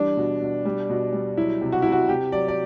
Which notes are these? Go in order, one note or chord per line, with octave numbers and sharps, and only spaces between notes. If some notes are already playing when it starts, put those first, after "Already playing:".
Already playing: E3 G3 D4
B2
B2
G3
B2
G3
F#3 E4
C3
F#4
C3 E4
F#4
C3 G4
F#3 D5
D5